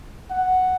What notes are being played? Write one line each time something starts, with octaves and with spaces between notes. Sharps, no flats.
F#5